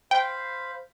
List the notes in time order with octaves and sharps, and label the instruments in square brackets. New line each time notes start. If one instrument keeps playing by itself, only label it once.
[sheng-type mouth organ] C5 F5 B5 [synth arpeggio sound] G5